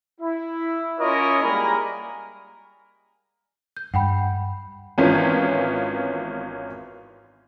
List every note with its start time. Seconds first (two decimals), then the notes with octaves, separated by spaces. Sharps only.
0.21 E4
1.00 C#4 E4 F4 A#4 C#5 D#5
1.42 G3 G#3 A#3 A#4 G#5 B5
3.77 G6
3.94 G2 F#5 G5 B5
4.98 G#1 E3 B3 C#4 F4